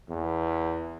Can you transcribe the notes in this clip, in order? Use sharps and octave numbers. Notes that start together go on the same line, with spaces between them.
E2